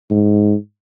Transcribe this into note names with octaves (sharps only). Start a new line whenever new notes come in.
G#2